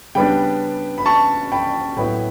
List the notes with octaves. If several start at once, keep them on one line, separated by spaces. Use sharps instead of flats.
C#3 G3 B3 D4 G5 B5
B5
A5 C#6
G5 B5
A2 F#3 B3 E4 G5 B5